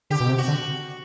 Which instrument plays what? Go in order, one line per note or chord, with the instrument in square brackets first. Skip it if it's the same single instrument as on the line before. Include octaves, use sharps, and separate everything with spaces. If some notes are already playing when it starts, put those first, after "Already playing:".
[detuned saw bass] D3 [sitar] G4
[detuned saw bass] B2
C3
[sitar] F#4
[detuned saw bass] D3